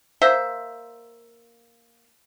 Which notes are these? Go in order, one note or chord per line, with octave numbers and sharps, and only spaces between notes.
A#3 C5 E5